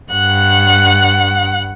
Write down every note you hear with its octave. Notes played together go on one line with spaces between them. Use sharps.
G2 F#5 F#6